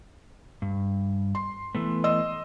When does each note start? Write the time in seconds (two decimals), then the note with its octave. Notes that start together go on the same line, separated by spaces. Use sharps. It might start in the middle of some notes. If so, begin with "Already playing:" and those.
0.62 G2
1.35 C6
1.75 E3 A3 B3
2.04 D#5 C6 E6